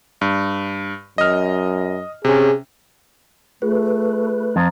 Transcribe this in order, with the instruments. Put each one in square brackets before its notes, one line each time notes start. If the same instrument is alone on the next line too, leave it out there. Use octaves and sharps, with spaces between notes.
[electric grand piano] G2
[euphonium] F#2 [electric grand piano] D#5 F6
[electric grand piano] C3 C#4 [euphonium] G#4
[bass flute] A3 [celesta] F4 G#4 [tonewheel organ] B4
[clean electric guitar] F2 [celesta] C5 A#5